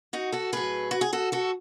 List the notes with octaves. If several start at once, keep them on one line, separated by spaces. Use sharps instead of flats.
D#4 F#4
F#4 A4
A2 F#3 G#4 B4
F#4
G#4
F#4 A4
F#4 A4